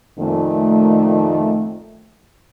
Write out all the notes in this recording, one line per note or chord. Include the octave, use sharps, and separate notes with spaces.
F2 A#2 D#3 A3